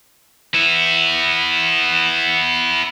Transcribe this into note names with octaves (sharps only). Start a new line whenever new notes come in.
B3 E4